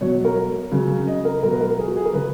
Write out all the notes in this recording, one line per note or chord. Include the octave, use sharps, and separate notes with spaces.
B2 F#3 C#5
A#4
C#3 F#3
D#5
A#4
B2 F#3 A#4
B4
A#4
G#4
F#4
G#4
A#4
C#3 F#3 B4